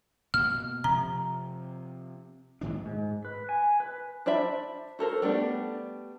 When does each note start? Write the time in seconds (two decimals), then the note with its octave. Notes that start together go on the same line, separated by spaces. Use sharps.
0.34 B2 A#3 F6
0.84 C3 F3 A#5
2.61 G#2 D#3 D4
2.86 G#2
3.25 B4
3.49 G#5
3.80 B4
4.26 D4 C5 D5 E5 B5
4.99 F#4 A4 A#4 C5
5.22 G3 A3 B3 D4